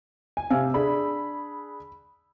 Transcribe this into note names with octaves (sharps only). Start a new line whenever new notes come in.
G#5
C3 F5 G#5 E6
D4 G#4 B5